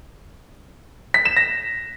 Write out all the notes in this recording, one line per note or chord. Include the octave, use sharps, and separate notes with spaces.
B6
E7
A#6